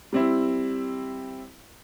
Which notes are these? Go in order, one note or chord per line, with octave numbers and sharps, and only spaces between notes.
G3 C4 E4